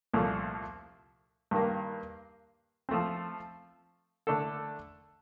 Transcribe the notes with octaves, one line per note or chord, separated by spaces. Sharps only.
C2 A#2 F3 A3
G2 D#3 A#3
F3 A3 C4
D3 A3 D4 A4